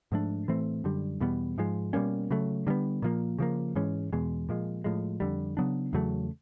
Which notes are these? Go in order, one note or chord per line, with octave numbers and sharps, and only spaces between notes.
G#2 F3 A3 D4
A2 E3 A3 C4
F#2 D3 G3
E2 B2 G3 B3
G#2 F3 G#3
B2 G3 A#3 C#4
C#3 F#3 A3
D3 G3 B3
A#2 F3 A#3
C#3 F3 A#3
G#2 E3 G#3 C#4
E2 B2 G#3
A#2 F3 G#3
A2 F3 G#3
F2 D3 G3
C#3 F#3 B3 D4
E2 C#3 F#3 A3